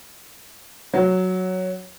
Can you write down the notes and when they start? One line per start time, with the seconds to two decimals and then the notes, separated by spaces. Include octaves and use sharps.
0.94 F#3